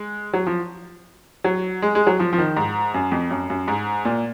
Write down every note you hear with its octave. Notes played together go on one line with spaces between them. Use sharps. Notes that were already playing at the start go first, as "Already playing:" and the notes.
Already playing: G#3
F#3
F3
F#3
G#3
G#3
F#3
F3
F3
D#3
G#2
F#2
F2
F#2
F#2
G#2
A#2